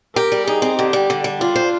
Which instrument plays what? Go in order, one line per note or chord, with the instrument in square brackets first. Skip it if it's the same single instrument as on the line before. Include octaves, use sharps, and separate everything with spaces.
[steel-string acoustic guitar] G4 [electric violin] A#4
[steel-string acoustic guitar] G3
[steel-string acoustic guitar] D#4 [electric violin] G#4
[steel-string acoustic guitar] C4
[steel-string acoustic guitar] D3 [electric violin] G4
[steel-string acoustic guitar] G3
D3
G3
[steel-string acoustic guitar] D4 [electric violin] F4
[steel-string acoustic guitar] C5